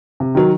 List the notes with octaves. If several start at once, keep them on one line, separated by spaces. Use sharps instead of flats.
C3
D#3 F#3